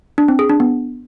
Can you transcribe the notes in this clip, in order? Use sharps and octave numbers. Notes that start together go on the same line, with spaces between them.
D4
C4
G#4
D4
B3